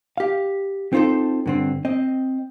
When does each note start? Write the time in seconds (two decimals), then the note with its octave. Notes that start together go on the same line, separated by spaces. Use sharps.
0.17 G4 F5
0.93 C4 D#4 F4 A4 C5
1.46 G2 D3 C4
1.85 C4 D#5